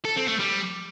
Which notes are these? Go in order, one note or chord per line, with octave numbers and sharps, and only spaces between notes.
A4
C4
A3
G3